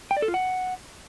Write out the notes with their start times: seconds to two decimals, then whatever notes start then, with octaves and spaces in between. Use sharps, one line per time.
0.11 G5
0.17 D5
0.22 A4
0.28 F4
0.34 F#5